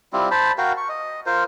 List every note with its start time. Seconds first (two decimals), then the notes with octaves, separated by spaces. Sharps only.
0.13 G3 C4 E4 F4
0.31 C5 A5 B5
0.58 F#4 A#4 F5 G5
0.77 C#6
0.89 D#5
1.26 F4 A#4 C5